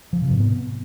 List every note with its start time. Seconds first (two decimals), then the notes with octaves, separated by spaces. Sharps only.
0.13 F3
0.22 C3
0.31 G#2
0.39 B3